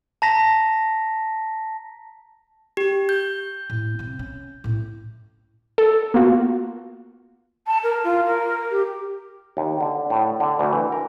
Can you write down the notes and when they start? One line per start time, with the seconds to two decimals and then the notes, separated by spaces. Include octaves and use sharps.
0.22 A5 A#5 A#6 B6
2.77 G4
3.09 G6
3.70 A2
3.99 C3 C4
4.19 C#4
4.64 A2 C3
5.78 A4
6.14 A#3 B3 F4 F#4
7.67 A5
7.84 A#4
8.04 F4
8.26 A#4
8.71 G4
9.57 D#2
9.81 D3
10.10 A2
10.40 D3
10.59 D2
10.73 E3
10.92 A#4